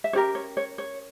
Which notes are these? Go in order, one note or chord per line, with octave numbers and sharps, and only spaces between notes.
E5
C#4 G4 A#4 C#5
C#5
C#5
C#5